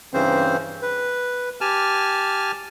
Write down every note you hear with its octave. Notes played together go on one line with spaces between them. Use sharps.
G2 C#3 E3 C4 C#4 C5
B4
G4 G#5 A5 F6